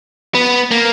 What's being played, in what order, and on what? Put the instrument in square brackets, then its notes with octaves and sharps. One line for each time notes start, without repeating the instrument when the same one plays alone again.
[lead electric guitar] B3
A#3